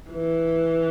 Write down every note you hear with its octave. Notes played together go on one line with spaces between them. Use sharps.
E3